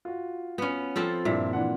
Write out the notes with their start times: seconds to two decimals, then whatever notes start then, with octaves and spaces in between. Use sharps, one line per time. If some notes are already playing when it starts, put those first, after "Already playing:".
0.05 F4 F#4
0.58 B3 C#4
0.96 F3 C4 A4
1.25 G2 A#2 E4 B6
1.53 E3 D4 F#5